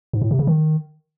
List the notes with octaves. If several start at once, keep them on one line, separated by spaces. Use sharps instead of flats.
G#2
A2
C3
C#3
D#3